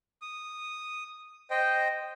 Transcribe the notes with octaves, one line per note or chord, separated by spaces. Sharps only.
D#6
C5 D#5 G5